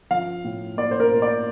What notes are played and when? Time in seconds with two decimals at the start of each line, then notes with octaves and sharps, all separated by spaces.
0.11 F3 F5
0.44 A2
0.77 A#3 D5
0.91 C5
1.00 A#4
1.11 A2
1.22 D5